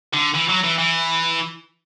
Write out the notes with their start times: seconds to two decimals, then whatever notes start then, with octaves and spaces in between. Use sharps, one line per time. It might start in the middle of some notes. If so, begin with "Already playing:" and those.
0.14 D3
0.35 E3
0.49 F#3
0.64 E3
0.78 E3